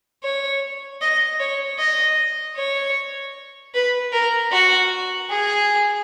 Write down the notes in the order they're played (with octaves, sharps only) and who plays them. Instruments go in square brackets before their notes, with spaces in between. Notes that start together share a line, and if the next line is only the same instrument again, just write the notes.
[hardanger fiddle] C#5
D#5
C#5
D#5
C#5
B4
A#4
F#4
G#4